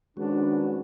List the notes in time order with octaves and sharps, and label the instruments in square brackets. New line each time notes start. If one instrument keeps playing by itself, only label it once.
[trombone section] D#3 F3 B4 [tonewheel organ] G#3 C#4 F#4 [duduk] D4